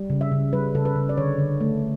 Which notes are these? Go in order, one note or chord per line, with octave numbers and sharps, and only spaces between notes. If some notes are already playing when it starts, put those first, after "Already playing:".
Already playing: G3
C#3
E5
C#3
G3 B4
C#3 A4
B4
C#3
D5
D3 C#5
D3
A3